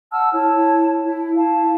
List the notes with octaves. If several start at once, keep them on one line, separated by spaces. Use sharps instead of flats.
F#5 A5 E6 F6
E4 C#5 A5
E4
E4 F5 A5